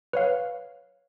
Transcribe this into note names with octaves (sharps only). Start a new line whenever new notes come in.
B4 C#5 F5